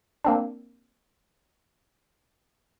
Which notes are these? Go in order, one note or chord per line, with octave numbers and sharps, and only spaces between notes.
A#3 C4 D4